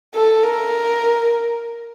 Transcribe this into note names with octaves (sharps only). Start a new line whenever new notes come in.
A4
A#4